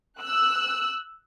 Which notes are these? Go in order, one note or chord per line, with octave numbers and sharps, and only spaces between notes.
E6 F#6